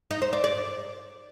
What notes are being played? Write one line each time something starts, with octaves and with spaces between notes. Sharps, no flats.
D#4
C5
D5
D5